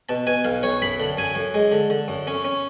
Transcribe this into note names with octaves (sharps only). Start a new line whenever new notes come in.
B2 A5
B2 G#5
B1 F5
B1 C#5
F#2 B5
D3
F#2 G#5
F#2
G#3
D3
D3
F#2
C#4
C#4